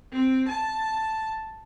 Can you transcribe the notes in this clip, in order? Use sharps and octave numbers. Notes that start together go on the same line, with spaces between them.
C4
A5